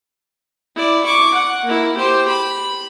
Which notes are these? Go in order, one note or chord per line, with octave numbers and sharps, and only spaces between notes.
E4 D5
C#6 D6
F#5
A#3 E4
G4 C5
B5